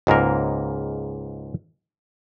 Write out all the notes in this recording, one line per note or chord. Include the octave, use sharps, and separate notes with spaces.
C#2 G#2 A#3 A#4